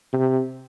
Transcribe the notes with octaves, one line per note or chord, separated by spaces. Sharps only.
C3